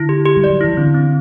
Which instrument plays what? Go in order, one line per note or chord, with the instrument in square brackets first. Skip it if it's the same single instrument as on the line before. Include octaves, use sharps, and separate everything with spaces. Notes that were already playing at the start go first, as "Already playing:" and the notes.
Already playing: [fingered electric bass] D3 [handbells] E4
[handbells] G4
G4
[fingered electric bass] G3
[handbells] D5
[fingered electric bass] F#3
[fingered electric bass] E3 [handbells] E4
[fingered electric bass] D3 [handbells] C4
[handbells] C4